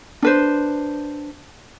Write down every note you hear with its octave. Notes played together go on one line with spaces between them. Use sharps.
D4 B4 C5